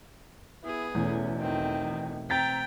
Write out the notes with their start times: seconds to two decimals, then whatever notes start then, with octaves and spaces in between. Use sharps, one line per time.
0.63 B3 E4 G#4
0.95 E2 B2 E3 A3 C#4
1.40 D#3 C4
2.30 C4 G5 A#5 A6 B6